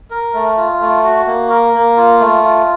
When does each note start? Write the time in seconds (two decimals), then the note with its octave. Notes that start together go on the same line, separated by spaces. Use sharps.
0.11 A#4
0.34 A3
0.57 F4
0.80 A3
1.04 F#4
1.27 A#3
1.50 A#4
1.74 A#3
1.97 F4
2.20 A3
2.43 F4